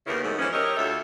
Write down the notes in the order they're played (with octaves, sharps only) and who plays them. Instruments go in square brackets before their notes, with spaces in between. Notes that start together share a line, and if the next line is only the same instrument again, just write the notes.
[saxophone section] D#2 C#3 B3 E4 A#4
G#2 D#3 F#3 G#3 A3
E3 F3 B3 C#4
G4 A#4 C#5 D#5 E5
D2 F4 A4 E5